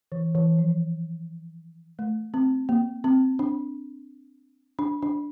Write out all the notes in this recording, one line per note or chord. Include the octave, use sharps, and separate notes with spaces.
E3
E3
F3
A3
C4
A#3
C4
D4
D4
D4